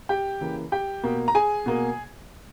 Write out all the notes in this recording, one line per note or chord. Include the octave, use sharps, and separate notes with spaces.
G4 G5
C#3 E3 A#3
G4 G5
B2 A#3
A#5
G#4 G#5
B2 A#3